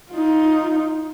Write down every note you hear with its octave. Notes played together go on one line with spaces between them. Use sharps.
D#4 F4